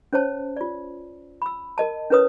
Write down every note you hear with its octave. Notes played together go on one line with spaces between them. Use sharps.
C#4 C5 C#5 A5
F4 D5
B5 E6
A#4 D#5 A5
C#4 E4 A#4 B4 C#5 D#6